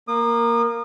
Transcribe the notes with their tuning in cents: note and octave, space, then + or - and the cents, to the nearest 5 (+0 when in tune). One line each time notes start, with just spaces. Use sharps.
A#3 +0 D#6 -35